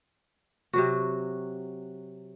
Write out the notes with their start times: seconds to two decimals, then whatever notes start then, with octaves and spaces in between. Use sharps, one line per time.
0.73 C3 F#3 F#4